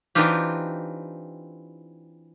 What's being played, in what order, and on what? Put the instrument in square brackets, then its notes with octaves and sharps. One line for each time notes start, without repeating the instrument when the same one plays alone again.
[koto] E3 C4 D4 D#4 F4 G4